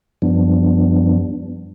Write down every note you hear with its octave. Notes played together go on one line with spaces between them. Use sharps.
F#2 F3 G3 B3 D4